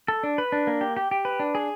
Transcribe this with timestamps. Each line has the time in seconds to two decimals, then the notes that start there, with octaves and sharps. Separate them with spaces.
0.08 A4
0.23 D4
0.38 B4
0.52 D4
0.67 A#3
0.81 G4
0.97 G4
1.11 G4
1.25 B4
1.40 D4
1.55 G#4